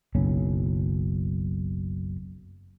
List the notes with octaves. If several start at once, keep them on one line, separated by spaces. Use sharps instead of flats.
F#1 B1 C#4